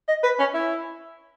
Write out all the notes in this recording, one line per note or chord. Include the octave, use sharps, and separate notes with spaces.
D#5
B4
C#4
E4